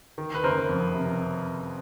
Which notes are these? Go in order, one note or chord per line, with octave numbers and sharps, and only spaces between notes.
D#3
B4
F#1 A#4 C5
F2
C3